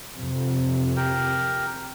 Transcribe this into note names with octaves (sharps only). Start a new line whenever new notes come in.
F2 C3
G4 A#4 G5